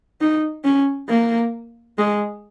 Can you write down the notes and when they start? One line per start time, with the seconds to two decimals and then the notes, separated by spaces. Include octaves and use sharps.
0.21 D#4
0.64 C#4
1.09 A#3
1.99 G#3